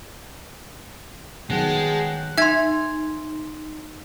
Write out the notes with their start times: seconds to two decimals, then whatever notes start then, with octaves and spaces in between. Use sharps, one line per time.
1.50 D#3 F#3 G#3 B3 F#5 G5 A5
2.38 D#4 E5 C6 G#6